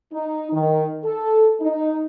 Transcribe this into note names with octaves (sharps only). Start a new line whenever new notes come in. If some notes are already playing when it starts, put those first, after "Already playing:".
D#4
D#3
A4
D#4